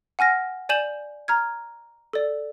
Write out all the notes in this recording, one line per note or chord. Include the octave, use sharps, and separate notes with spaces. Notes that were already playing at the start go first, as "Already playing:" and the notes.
F#5 G#5 F6 A#6
D5 G#5 G6 E7 F#7
A#5 F6 G#6
A4 D5